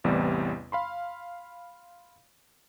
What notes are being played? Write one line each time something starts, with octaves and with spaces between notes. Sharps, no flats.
A1 E2 C3 G3 B3 D5
F5 B5 C6